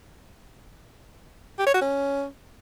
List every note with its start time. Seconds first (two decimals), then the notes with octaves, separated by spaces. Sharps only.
1.59 G4
1.66 C#5
1.74 F#4
1.82 C#4